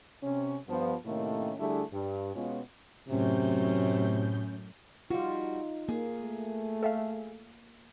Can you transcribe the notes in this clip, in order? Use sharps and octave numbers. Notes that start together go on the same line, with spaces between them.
C3 C#4
G2 F3 B3
A2 C3 D#3 A3 A#3 C#4
D3 G3 A3 D4 E4 G#4
G2
B2 G#3 B3 C#4 F4
F#2 A2 C3 F#3 C#4 G6
G3 D#4 F4 F#4
A#3 G#4
A3
A4 E5 F5